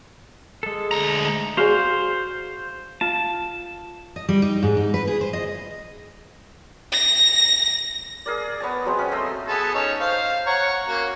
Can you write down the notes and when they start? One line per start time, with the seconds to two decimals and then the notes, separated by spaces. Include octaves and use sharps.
0.63 G#3 A4
0.91 D2 A#5
1.57 F#4 G#4 C5 D5 F5
3.01 F4 A5
4.16 D#5
4.29 G3
4.42 D#4
4.63 G#2
4.77 D#4
4.94 B4
5.07 G#4
5.21 C5
5.33 D#5
6.92 A#6
8.26 G#4 A#4 D5
8.60 B3 C#5 A5
8.85 F#3 G#3 C4
8.99 C#4
9.12 A3 D#5 C6 E6
9.47 B3 G#4 A4
9.74 C#4 D#4 A4
10.00 C5 F5
10.46 C#5 F#5 A#5
10.87 A#3 C#4 F#4